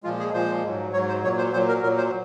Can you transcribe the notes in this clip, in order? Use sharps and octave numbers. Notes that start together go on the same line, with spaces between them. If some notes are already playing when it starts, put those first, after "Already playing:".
A#2 F3 G#3 F4
G#4
A#2 F3 G#3 C5
G#2 F#3
G#2 F#3 C#5
C5
A#2 F#3 C#5
C5
A#2 F#3 C5
A#4
A#2 F#3 A#4
C5